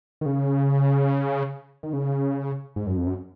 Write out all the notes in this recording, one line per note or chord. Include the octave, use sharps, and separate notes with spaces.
D#3
C#3
D#3
C#3
G#2
F#2
F2
F#2